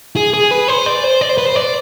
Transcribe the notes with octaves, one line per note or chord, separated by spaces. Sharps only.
G#4
G#4
B4
C5
D5
C5
D5
C5
B4
C5
D5